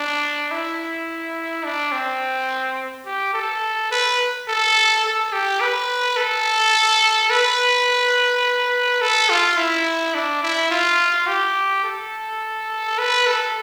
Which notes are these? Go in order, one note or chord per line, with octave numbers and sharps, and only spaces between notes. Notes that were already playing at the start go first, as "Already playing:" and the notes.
Already playing: D4
E4
D4
C4
G4
A4
B4
A4
A4
G4
B4
A4
B4
A4
F4
E4
D4
E4
F4
G4
A4
B4
A4